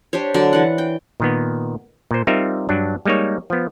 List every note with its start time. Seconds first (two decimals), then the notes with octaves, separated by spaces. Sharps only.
0.13 D4 G4 C5 C#5
0.34 D3 F#3 D5
0.53 E3 F#5
0.78 G5
1.20 A#2 D#3 B3
2.11 A#2 C5
2.27 G3 C4 D#4 F4 A#4 E5
2.69 G2 F#3 D4
3.06 G3 G#3 A#3 D#4 C#5
3.50 F3 B3